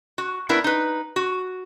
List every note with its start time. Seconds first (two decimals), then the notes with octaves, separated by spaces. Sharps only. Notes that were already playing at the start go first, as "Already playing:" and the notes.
0.18 F#4
0.49 B3 D4 E4 A#4 B4
0.64 D#4 B4
1.16 F#4